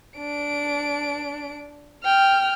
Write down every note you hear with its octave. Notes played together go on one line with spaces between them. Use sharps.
D4 D7
G5 F6